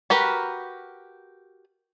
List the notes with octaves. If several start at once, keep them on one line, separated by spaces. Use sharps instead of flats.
F#4 G4 A#4 B4